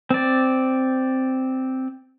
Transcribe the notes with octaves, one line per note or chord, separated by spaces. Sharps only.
C4 D5